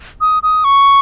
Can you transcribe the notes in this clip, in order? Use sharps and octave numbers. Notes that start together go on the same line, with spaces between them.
D#6
D#6
C#6